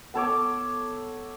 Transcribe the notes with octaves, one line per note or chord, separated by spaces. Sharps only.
B3 A4 C#5 D6